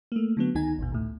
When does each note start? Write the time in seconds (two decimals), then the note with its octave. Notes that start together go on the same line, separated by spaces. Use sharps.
0.12 A3 A#3
0.37 D3 F#3 B3
0.55 D2 D#3 D#4 G#5
0.78 G#1 E2 B2
0.92 D2 A2